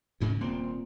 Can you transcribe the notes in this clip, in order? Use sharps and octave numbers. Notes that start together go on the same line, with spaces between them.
D2 G#2 C#3
D#1 A#2 C4